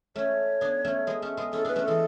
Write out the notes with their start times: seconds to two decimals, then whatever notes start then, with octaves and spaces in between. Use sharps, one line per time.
0.16 A3 C#4 C#5
0.61 B3 D4
0.85 A3 C#4
1.07 G#3 B3
1.22 A3 C#4
1.37 G#3 B3
1.53 C#4 E4 A4
1.65 B3 D4 B4
1.76 A3 C#4
1.84 E3 G#3 A4